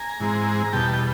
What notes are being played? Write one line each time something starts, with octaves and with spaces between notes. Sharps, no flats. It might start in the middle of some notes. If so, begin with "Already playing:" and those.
Already playing: G#5 A#5
G#2 E3 G#3 C4
A#5
E2 B2 G3 G5 A5
G5